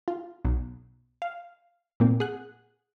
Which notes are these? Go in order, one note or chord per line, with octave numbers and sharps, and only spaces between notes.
F4
B1
F5
A#2 A#3 C4
G#4 F#5 F#6